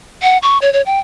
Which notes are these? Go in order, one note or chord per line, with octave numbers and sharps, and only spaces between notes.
F#5
C#6
C#5
C#5
G5